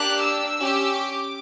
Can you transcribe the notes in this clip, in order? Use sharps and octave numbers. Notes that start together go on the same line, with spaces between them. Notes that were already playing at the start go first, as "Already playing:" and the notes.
Already playing: A#3 D4 G4 F#6
E6
C#4 G4
D6